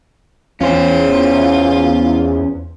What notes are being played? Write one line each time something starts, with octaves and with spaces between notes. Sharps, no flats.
E2 C#4 F4 C5